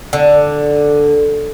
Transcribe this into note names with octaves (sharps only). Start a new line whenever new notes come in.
D3